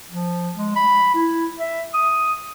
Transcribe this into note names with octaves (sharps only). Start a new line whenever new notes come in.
F3
G#3
B5
E4
E5
D#6